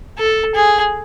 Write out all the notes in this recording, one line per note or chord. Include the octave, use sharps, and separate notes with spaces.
A4
G#4